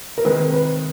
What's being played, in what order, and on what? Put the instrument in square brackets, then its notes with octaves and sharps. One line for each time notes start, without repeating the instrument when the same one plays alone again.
[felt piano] A#4
[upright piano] C3 D#3 G#3 [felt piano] B4
[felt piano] B4